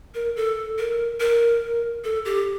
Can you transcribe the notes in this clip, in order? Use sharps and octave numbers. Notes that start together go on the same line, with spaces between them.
A#4
A4
A#4
A#4
A4
G4